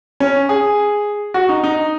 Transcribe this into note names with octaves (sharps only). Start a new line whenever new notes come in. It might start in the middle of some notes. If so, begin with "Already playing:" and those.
C#4
G#4
F#4
D#4
D#4